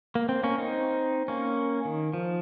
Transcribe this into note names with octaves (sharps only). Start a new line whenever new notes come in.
A#3
C4
A#3 C#4
C4 D#4
A#3 C#4
D#3
F3